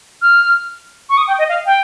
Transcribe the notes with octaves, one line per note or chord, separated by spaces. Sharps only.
F6
C#6
D#6
G5
D#5
F5
G5